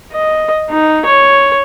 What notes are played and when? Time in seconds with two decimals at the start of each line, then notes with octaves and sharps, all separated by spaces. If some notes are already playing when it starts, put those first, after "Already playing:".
0.12 D#5
0.70 D#4
1.06 C#5